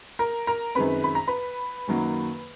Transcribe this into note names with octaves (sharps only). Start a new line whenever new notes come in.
A#4 A#5
A#4 A#5
F#2 D#3 G#3 C4 B4 B5
B5
A#5
B4 B5
F#2 D#3 F#3 A#3